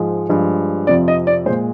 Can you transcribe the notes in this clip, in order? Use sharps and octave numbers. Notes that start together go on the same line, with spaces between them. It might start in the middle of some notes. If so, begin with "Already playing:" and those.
Already playing: G#2 F3 G#3
G2 F3 G#3
F2 C3 F3 D5
D#5
D5
A#2 G#3 C5